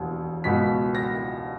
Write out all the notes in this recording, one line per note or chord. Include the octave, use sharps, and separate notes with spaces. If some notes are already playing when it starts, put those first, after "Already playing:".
Already playing: E1 D#2
C#2 B2 B6
A#6